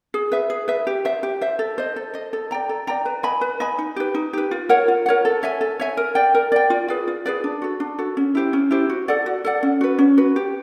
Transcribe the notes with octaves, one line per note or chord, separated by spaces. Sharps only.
G#4
B4 E5
G#4
B4 E5
G4
C5 E5
G4
C5 E5
A4
C5 D#5
A4
C5 D#5
A4
D5 G5 A#5
A4
D5 G5 A#5
B4
D#5 G#5 B5
B4
D#5 G#5 B5
D#4
G4 B4
D#4
G4 B4
F4
A#4 C#5 F#5
F4
A#4 C#5 F#5
A4
C#5 E5 G#5
A4
C#5 E5 G#5
A#4
D5 G5
A#4
D5 G5
F4
G#4 B4 D5
F4
G#4 B4 D5
D4
F#4 A4
D4
F#4 A4
C#4
E4 G4 C5
C#4
E4 G4 C5
F#4
A4 D5 F#5
F#4
A4 D5 F#5
C#4
F#4 B4
C#4
F#4 B4
G4